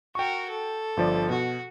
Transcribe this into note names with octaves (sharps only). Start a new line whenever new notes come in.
F#4 A#4 G5 C#6
A4
G1 F3 D5
B2 F#4